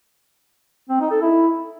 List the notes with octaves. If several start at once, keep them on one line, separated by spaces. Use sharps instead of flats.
C4
D#4
A4
E4